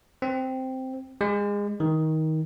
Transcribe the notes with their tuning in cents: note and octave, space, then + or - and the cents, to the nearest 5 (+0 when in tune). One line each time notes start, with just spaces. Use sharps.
C4 -5
G#3 -25
D#3 +20